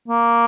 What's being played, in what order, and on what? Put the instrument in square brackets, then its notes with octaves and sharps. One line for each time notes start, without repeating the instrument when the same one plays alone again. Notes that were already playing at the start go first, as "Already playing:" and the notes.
[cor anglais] A#3